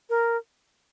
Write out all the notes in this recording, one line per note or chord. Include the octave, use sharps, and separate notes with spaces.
A#4